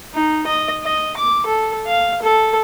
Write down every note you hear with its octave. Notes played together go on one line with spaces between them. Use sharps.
D#4
D#5
D#5
D6
A4
F5
A4